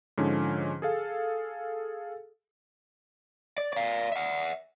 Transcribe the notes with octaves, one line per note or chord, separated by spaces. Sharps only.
G#2 D3 F3 C#4
G#4 A4 F5
D5
D5 F5
E5 F#5